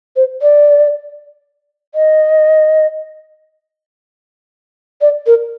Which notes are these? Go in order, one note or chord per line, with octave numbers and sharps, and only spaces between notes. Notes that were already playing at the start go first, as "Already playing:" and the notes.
C5
D5
D#5
D5
A#4